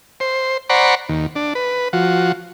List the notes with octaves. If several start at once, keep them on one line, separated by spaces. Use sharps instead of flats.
C5
C5 D5 F#5 A#5 B5 C#6
D#2
D4
B4
F3 F#4